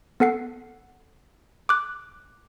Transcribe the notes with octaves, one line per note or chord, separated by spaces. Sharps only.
B3 A4 F#5 C7
D6 F#6